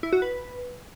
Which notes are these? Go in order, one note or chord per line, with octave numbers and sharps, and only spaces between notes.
E4
F#4
B4